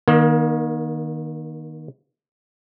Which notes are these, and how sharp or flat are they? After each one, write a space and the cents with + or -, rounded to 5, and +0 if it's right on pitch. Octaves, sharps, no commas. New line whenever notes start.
D#3 -5 A#3 +35